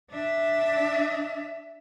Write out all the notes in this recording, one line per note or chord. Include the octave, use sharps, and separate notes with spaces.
D4 E5